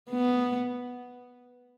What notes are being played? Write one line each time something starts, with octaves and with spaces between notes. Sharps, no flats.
B3